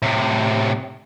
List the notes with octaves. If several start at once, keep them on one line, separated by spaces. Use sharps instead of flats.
A2 C3